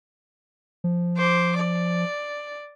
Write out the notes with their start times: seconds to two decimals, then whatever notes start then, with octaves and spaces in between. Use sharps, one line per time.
0.84 F3
1.17 C5 D6
1.57 D5